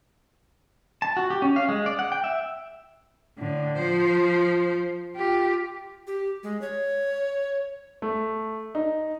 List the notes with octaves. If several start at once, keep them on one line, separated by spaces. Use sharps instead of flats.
A5
F#4
G4
C#4
F5
G#3
D5
F#5
G5
E5
A2 D3
F3 C5
F4 G4
G4
G#3
C#5
A3
D#4